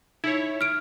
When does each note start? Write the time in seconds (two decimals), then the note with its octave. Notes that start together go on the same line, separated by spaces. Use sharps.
0.24 D#4 E4 C#5
0.61 F6 D7